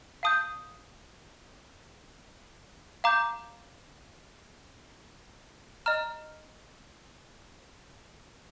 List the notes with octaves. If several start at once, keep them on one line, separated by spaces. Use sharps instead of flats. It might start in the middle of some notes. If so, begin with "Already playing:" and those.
F5 A5 D#6 G6
F5 A#5 D6 G6
D#5 A#5 F6